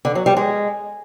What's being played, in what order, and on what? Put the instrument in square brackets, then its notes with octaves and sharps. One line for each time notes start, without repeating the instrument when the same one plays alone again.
[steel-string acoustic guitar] D3
F#3
G3
G#3